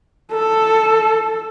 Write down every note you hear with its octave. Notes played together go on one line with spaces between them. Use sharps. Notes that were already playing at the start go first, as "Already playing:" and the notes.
A4